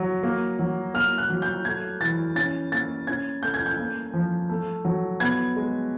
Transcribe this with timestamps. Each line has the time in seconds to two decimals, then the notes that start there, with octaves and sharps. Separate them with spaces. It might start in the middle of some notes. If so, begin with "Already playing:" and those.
Already playing: F#3
0.23 A#3
0.59 F#3
0.94 A#3 F6
1.18 F#6
1.30 F#3
1.42 G6
1.65 A3 G#6
2.00 E3 A6
2.36 C#4 A6
2.72 A#3 A6
3.07 C#4 G#6
3.42 A3 G6
3.54 G#6
3.66 G6
3.78 A#3
4.14 F3
4.50 A3
4.85 F#3
5.20 B3 G#6
5.56 G#3